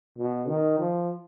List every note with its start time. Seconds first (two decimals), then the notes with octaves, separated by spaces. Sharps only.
0.18 B2
0.48 D#3
0.79 F3